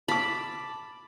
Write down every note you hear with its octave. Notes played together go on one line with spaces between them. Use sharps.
A5 B5 D6